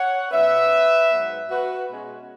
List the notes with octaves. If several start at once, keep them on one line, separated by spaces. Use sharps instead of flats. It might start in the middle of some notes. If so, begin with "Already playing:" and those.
Already playing: C#5 F#5
B2 F#3 C#4 B4 E5
G#2 F#3 B3
F#4 B4
B2 G#3 C#4